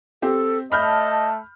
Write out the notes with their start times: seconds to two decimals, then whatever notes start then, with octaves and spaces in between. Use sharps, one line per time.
0.22 C4 G4 A4
0.72 A3 D#5 A5 B5 F6 G6